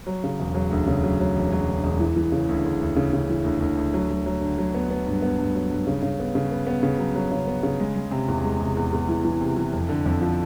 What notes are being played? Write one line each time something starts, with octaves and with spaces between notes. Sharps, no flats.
F#3
C#3
E1
F#3
D2
C#3
F#3
F#3
E1
F#3
E1
E1
E3
E3
C#3
D2
D2
D2
C#3
C#3
E3
D2
D2
D2
F#3
F#3
F#3
D3
F#3
B3
B3
G2
B3
G2
F#3
G2
C#3
C#3
B3
C#3
B3
B3
C#3
F#3
F#3
C#3
B3
C#3
G#3
G#3
C3
E2
G#3
C3
E2
E2
E3
E3
C3
E3
F2
D3
F2
F3